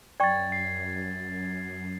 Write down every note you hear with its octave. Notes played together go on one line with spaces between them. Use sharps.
F#2 D5 G5 C#6 G#6 A6
C7